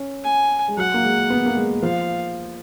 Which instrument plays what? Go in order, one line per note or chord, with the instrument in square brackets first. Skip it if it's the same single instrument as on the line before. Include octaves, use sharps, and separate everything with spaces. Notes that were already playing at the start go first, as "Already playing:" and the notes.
Already playing: [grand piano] C#4
[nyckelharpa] G#5
[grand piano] G#3
[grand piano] F#3 [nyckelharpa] F#5
[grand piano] A#3
G#3
B3
A#3
G#3
[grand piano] F3 [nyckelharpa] F5